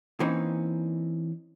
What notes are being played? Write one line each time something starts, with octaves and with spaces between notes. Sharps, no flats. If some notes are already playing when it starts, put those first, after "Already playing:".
E3 A#3 C4 C#4 D#4